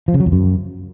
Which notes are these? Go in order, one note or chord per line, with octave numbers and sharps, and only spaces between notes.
F3
C#3
F#3
E2
F#2